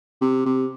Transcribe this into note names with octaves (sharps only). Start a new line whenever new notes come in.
C3
C3